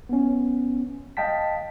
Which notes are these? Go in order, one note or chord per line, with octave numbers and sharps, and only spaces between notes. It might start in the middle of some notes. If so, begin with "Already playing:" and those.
B3 C#4
D#5 F5 G5 A5 B6